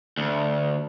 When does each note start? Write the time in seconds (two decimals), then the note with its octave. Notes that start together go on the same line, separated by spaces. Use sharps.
0.17 D2